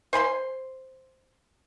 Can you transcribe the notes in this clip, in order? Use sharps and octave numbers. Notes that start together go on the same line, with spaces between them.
C5 G#5 B5 C6